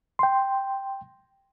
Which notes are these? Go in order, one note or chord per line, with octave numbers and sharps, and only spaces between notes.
G5 C6